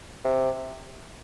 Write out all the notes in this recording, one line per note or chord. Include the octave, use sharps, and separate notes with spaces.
C3